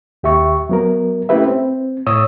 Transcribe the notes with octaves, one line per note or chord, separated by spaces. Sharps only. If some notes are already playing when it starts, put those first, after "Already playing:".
D#2 G4 E5 C#6
F#3 B3 A#4
A3 C#4 E4 G4 B4 E5
C4
A2 C#5 D#6 E6